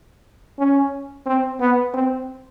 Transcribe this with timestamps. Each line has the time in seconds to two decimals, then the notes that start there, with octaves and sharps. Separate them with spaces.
0.59 C#4
1.26 C4
1.60 B3
1.94 C4